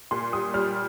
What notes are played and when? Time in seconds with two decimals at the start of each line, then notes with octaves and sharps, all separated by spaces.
0.11 A#2 C6
0.33 G3 D#6
0.54 G3 F6